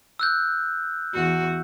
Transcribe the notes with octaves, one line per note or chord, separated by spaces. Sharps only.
E6 F#6 G6
E2 F#4